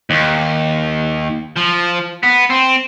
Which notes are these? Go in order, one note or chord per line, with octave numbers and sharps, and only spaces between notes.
D#2
F3
B3
C4